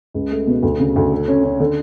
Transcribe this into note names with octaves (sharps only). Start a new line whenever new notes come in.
C#2
A3
B2
D2
C#3
D2
A4
C#4
C#4
D3